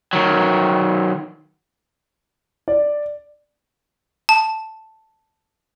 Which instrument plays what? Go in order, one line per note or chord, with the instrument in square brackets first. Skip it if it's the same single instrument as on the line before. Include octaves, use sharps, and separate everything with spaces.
[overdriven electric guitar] D#3 F#3
[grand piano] D5
[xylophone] A5